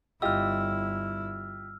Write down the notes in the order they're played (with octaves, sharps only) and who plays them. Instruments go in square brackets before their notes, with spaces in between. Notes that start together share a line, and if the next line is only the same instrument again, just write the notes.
[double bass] G1 E4 [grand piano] F4 G4 D#5 [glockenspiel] E6 F6